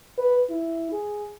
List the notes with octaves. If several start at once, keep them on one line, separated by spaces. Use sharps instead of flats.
B4
E4
G#4